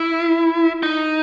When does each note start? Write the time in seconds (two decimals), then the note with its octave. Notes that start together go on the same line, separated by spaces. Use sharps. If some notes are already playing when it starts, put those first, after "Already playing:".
Already playing: E4
0.83 D#4